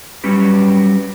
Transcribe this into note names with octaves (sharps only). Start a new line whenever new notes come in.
F#3 G3 C#4 G4 B4